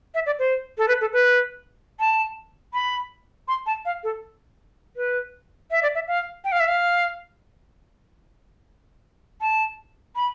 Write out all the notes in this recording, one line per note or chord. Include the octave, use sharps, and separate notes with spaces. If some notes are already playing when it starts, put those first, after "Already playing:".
E5
D5
C5
A4
B4
A4
B4
A5
B5
C6
A5
F5
A4
B4
E5
D5
E5
F5
G5
F5
E5
F5
A5
B5